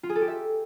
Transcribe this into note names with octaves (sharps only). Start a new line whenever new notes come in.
F4
G#4
A4
G4
E5